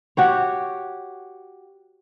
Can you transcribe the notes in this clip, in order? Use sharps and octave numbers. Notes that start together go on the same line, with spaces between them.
F#4 G4 C#5